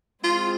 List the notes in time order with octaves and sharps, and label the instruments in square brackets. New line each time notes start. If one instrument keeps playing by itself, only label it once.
[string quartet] G#3 C4 G#4 C5 [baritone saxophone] F4